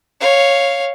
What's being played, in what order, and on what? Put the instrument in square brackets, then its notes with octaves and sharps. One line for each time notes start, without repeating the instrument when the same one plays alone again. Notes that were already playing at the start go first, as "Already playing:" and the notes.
[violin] C#5 F5